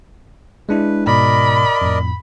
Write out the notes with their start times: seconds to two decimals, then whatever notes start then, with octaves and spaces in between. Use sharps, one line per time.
0.69 G#3 D4 E4 B4
1.07 G#2 B2 A#4 D5 D#5 B5
1.82 F2 A2